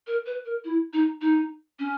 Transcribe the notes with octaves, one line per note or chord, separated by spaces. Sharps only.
A#4
B4
A#4
E4
D#4
D#4
C#4